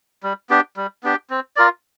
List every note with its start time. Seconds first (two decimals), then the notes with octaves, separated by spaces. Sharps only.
0.23 G3
0.50 B3 D4 G4
0.77 G3
1.03 B3 D4 G4
1.30 C4
1.56 F4 A#4 D5